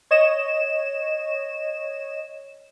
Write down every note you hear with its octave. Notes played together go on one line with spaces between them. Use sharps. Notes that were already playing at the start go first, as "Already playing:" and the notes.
C#5 D#5 E7